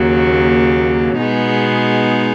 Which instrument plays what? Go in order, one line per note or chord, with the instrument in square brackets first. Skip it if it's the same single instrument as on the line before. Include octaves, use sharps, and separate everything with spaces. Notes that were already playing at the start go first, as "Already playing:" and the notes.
Already playing: [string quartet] D#2 C#3 F#3 A#3
B2 G#3 B3 D#4 G#4